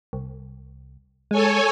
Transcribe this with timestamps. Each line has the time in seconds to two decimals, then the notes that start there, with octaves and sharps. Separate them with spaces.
0.13 C2
1.31 G#3 A4 C#5 G#5